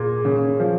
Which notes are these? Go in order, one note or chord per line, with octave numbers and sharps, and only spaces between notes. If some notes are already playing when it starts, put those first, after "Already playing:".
Already playing: A#2 G#4 A#4
C#3
F3